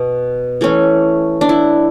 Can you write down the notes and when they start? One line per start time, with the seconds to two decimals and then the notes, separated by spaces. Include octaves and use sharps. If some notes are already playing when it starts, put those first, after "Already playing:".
Already playing: B2
0.61 E3 A3 C#4
1.41 D4
1.49 E4